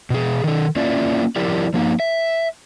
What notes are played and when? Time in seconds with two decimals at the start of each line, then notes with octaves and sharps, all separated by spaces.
0.10 B2 G#4
0.44 D#3 A4
0.76 A#3 C#4 E4 F4 D5
1.36 F3 E4 G4 A#4 D5
1.74 F3 A#3 D#4
2.00 E5